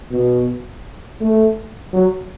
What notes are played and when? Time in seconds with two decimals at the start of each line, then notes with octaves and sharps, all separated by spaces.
0.11 B2
1.21 A3
1.93 F#3